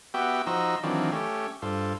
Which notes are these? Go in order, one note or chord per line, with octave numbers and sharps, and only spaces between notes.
B3 F#4 G4 E5 G5
F3 D#4 F#4 C5 A#5 E6
D#3 E3 F#3 C4 D4 F4
A3 C#4 G4
G2 F4 A4 C5